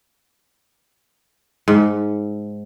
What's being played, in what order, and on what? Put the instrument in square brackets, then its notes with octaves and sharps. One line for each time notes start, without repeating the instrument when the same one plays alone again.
[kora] G#2